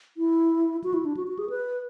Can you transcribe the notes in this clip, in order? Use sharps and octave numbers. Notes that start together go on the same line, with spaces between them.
E4
F#4
E4
D4
F#4
F#4
G#4
B4